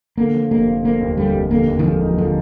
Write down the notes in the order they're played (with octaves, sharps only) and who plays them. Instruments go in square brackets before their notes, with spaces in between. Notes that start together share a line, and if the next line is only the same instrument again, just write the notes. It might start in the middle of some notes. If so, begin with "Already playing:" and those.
[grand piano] D3 [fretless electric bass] A#3
[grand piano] F3
[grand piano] F1 [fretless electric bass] A#3
[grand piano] F3
[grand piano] F3 [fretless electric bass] A#3
[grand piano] D#2
[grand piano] D3 [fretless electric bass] G3
[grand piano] F1
[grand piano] D3 [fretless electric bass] A#3
[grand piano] D#2
[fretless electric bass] D#3
[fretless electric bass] F3 [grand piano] G#3
[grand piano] D#4
[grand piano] D3 [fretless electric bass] F3